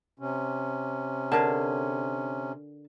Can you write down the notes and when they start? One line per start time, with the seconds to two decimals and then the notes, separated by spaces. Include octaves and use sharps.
0.19 C3 C#4
1.32 D3 G#4 A#4 A5